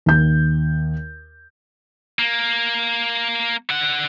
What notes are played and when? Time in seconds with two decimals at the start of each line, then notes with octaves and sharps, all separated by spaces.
0.06 D#2 G6
2.19 A#3
3.70 D3 F#5